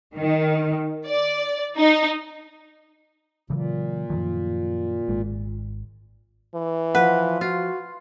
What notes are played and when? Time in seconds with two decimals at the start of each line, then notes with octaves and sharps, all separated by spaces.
0.14 D#3
1.07 D5
1.76 D#4
3.50 A#2 C#3 E3 F#3
4.10 F#2 D#3 F3
5.09 G#1 G#3
6.54 E3
6.95 F3 B4 F#5
7.41 F4 F#4